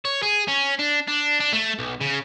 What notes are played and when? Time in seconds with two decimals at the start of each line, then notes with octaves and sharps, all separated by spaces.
0.05 C#5
0.23 G#4
0.48 C#4
0.79 D4
1.08 D4
1.40 D4
1.53 A3
1.79 B1
2.01 C#3